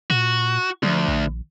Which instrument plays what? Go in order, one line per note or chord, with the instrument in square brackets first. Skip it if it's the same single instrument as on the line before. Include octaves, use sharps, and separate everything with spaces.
[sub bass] A#2 [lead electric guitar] F#4
[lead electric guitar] D2 [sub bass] F3
[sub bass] A#1